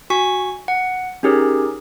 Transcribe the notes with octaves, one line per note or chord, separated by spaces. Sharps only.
F#4 G#5 C#6 B6
F#5
C#4 D#4 G4 G#4 A#4 C#5